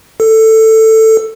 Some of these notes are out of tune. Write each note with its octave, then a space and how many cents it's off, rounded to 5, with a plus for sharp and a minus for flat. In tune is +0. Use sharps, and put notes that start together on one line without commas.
A4 +10